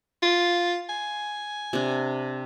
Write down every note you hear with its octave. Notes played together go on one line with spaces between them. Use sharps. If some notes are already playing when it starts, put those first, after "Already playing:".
F4
G#5
C3 D4